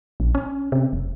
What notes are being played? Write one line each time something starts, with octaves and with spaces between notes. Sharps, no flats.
A#1
C#4
C3
F1